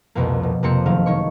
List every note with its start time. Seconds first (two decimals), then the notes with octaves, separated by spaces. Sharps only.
0.15 C2 F2 B2 A#3
0.43 B2
0.63 F2 C3 A#3 C4 C#7
0.86 F#1 D#3 F#3 A3 F5
1.06 D#3 C#5 C#6